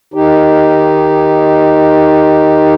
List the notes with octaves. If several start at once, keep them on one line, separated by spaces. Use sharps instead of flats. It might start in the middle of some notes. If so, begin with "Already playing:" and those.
D#3 D#4 G4